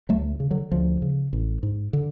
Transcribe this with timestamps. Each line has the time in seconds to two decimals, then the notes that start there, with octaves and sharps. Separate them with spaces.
0.09 D2 F#3 A3
0.40 C#3
0.51 D3 F#3
0.72 D2 F3
1.02 C#3
1.33 A1
1.63 G#2
1.93 D3